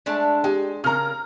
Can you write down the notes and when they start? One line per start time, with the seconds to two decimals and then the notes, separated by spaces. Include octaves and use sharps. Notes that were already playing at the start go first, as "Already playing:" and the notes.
0.06 G#3 A3 D4
0.44 G#3 G4
0.84 C#3 A#4 A#5 F6